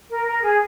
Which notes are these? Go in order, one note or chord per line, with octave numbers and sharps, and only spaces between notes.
A#4
A#4
G#4